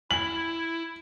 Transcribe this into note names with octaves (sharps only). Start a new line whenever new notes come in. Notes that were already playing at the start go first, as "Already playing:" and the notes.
E4 F#7